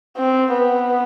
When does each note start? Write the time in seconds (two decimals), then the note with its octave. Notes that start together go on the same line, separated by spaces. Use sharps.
0.17 C4
0.52 B3